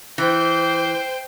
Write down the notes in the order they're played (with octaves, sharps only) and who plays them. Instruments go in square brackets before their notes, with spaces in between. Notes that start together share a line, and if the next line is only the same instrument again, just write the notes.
[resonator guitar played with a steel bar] E3 [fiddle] C5 G5